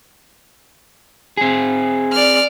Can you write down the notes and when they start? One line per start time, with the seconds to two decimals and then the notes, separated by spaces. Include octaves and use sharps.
1.37 C4 G#4
2.13 D5 F6